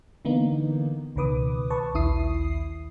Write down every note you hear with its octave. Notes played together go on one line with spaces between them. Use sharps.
D3 E3 A#3 B3 D#4
C#2 B2 D#3 B4 D6 D#6
B4 A5 C#6
A#1 D#2 E4 D#6 C7